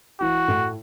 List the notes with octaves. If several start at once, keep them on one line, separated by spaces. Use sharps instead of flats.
E3 F#4
A2